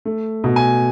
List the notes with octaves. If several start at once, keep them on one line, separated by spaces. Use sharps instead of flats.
A3
B2
G#5